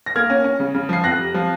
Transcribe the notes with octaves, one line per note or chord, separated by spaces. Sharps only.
A#6
A#3 F6 G#6
C#4
C#4
C#3
C#3
F3 C7
F2 F#6 A#6
C3
F3